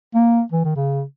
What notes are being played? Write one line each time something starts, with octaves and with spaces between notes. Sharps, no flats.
A#3
E3
D#3
C#3